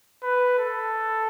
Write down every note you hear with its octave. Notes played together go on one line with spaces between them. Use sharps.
B4
A4